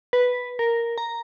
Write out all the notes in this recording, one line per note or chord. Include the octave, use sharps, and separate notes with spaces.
B4
A#4
A#5